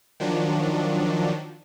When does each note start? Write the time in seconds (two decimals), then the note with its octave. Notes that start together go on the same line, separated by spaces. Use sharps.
0.20 D#3 F3 F#3 D4